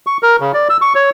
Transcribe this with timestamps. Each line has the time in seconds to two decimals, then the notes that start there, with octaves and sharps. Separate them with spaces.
0.07 C#6
0.23 A#4
0.40 C#3
0.54 D5
0.70 E6
0.82 C#6
0.95 C#5